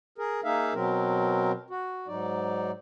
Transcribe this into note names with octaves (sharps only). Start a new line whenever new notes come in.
G#4 A#4
A#3 D#4 G#4 E5 F5
B2 F#3 C4 A#4
F#4
G#2 F#3 D#4 D5